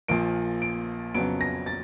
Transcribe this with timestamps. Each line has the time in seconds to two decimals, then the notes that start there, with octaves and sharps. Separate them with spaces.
0.08 A#1 A#2 F3 D7
0.62 D7
1.14 F2 C#3 F#3 B3 D7
1.41 A#6
1.66 A6